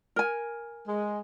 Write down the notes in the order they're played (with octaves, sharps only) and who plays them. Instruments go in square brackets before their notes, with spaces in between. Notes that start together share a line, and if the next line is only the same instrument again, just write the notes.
[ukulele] A#4 G#5
[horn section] G#3